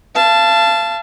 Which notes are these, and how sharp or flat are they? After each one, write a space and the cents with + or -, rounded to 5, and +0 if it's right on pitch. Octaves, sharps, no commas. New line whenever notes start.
F5 -35 A5 +0